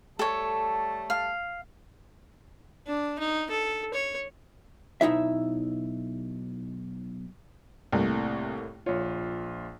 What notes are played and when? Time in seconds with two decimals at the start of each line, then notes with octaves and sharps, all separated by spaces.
0.19 G3 A3 A4 C#5 A5
1.10 F5
2.87 D4
3.19 D#4
3.50 A4
3.94 C#5
5.01 B1 D#4 E4 E5
7.92 C2 A2 A3 A#3
8.86 A#1 F4 C#5